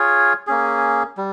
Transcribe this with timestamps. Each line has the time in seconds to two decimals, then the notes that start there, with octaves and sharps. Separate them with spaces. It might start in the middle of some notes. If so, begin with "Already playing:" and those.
Already playing: F4 G#4 C#5
0.47 A#3 C#4 G#4
1.17 G3